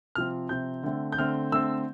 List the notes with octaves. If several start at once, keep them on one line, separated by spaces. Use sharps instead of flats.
C3 F3 C4 F6
C3 F3 C4 G6
D3 A3 C4
G6
D3 A3 C4 F6
D3 A3 C4 E6